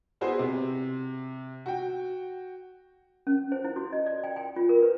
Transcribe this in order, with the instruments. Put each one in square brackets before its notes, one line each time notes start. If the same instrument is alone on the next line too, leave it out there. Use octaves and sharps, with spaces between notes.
[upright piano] B3 E4 F#4 G#4 B4 C5
C3
F#4 G5
[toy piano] C#4
C5
E4
F#4
D#5
D5
G5
G5
F4
A#4
B4